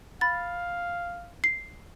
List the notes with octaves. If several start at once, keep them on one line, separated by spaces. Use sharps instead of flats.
F5 B5 A6
C7